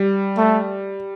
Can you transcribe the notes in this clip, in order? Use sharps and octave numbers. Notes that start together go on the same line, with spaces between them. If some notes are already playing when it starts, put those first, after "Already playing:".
Already playing: G3
A3